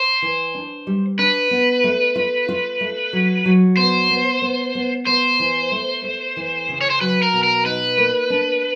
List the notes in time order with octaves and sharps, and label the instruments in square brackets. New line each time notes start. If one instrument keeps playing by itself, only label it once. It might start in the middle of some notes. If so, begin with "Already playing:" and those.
Already playing: [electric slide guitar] C5
[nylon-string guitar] E3
D4
G3
[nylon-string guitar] D4 [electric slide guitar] B4
[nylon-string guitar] B3
A3
F4
F4
A3
F#3
F#3
[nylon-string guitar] B3 [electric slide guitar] C5
[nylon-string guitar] B3
B3
B3
[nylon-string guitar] B3 [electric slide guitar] C5
[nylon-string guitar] E3
A3
A3
E3
C#3
[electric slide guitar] C#5
C5
[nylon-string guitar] F#3 [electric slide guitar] B4
[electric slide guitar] A#4
[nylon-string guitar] B2
[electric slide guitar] A#4
[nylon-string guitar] D#4 [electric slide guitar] B4
[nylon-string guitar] A#3
D4